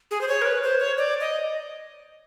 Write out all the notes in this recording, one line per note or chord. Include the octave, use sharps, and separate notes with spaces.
G#4
C5
C#5
A#4
B4
C5
C#5
D5
D#5